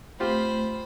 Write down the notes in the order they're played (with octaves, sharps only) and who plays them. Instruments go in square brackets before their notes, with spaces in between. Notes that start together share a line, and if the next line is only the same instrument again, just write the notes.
[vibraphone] A3 [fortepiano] C4 F4 G4 [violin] C5 B5